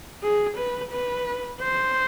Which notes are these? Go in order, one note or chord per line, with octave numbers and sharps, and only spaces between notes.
G#4
B4
B4
C5